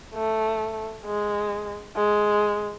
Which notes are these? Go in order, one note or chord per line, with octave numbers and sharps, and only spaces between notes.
A3
G#3
G#3